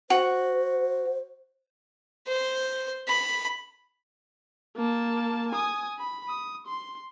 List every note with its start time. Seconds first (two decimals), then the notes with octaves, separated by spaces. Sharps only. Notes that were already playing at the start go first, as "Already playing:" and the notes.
0.10 F#4 C5
2.27 C5
3.08 B5
4.76 A#3 A5
5.51 G#5 D#6
5.99 B5
6.28 D#6
6.66 C6